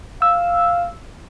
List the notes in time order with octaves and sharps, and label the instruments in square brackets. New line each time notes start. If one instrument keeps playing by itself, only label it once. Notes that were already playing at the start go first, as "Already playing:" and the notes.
[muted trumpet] F5 [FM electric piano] E6